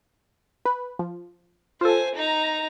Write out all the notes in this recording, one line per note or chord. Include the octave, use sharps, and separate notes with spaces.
B4
F3
F4 A4 C5 G#5
D#4 A#5